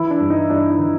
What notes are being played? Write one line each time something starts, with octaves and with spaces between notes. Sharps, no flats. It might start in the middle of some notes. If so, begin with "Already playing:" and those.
Already playing: E3 E4
D4
G2
D#4
G2 D4
D#4
E3